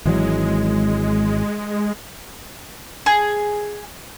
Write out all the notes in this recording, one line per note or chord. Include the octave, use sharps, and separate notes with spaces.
G#1 E3 F#3 G#3
G#4